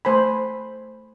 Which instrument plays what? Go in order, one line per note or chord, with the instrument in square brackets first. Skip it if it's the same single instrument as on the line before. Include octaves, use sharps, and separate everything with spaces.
[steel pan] A3 C5 G#5 B5